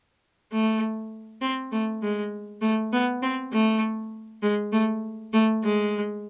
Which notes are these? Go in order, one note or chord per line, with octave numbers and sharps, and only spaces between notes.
A3
C4
A3
G#3
A3
B3
C4
A3
G#3
A3
A3
G#3